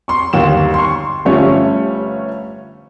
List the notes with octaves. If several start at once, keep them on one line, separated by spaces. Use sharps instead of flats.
C6 C#6
G1 D#2 E7
C6 C#6
G1 F3 G3 A3 C#4 C#5